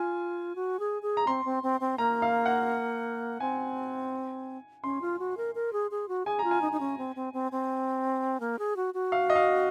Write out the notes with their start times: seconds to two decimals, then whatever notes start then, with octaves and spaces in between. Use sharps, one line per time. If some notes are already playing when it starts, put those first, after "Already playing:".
Already playing: F4 G#5
0.56 F#4
0.79 G#4
1.02 G#4
1.17 A#5
1.27 C4 C6
1.45 C4
1.63 C4
1.80 C4
1.98 A#3 A#5
2.22 F5
2.46 F#5
3.40 C4 G#5
4.84 C#4 C6
5.02 F4
5.19 F#4
5.37 A#4
5.55 A#4
5.73 G#4
5.91 G#4
6.08 F#4
6.26 G#4 G#5
6.39 A#5
6.44 F4
6.51 G#5
6.61 D#4
6.72 D#4
6.80 C#4
6.98 C4
7.16 C4
7.33 C4
7.52 C4
8.40 A#3
8.59 G#4
8.76 F#4
8.94 F#4
9.12 F5
9.30 D#5
9.36 F5